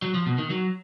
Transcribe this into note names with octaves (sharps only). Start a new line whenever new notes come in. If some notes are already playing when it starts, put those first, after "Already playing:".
F#3
F3
B2
D#3
F#3